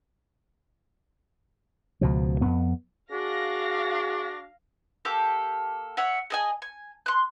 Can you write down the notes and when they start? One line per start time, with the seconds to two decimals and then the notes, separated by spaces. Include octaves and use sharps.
2.01 C#2 B2 F3
2.41 F2 B3
3.11 D4 F#4 G#4 F5 A#6
5.05 A#3 G4 A4 D6
5.97 C#5 E5 F#5
6.30 G#4 D#5 G#5
6.62 G#5
7.06 C6 F#6